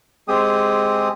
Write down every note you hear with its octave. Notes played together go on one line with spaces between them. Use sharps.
G#3 C4 G4 G#4 D#6